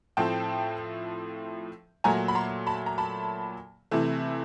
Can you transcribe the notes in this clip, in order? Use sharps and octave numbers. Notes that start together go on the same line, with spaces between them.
A2 F3 A3 C4 G5 A5
A#2 F#3 A3 G#5 A#5
B5
A#5 C6
A5 B5
A#5
A5 B5
C3 E3 A3